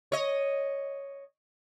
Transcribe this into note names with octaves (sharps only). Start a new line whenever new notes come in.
C#5 D#5